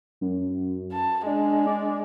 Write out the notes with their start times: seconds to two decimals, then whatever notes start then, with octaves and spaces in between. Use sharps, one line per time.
0.21 F#2
0.92 A5
1.26 G#3 D4
1.67 D5